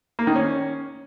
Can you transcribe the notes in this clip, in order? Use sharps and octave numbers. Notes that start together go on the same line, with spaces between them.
A#3
D#3
C#4